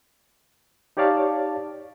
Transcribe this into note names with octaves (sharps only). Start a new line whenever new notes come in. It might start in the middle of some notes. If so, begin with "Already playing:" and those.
D#4 G4 C#5 D5 F5 A5